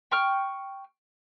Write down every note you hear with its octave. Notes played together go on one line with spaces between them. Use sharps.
G5 C#6 F6